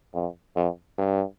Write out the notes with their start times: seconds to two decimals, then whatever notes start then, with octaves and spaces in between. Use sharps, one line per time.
0.14 F2
0.56 F2
0.98 G2